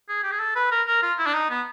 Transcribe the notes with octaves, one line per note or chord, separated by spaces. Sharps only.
G#4
G4
G#4
A4
B4
A#4
A#4
F4
E4
D4
D#4
B3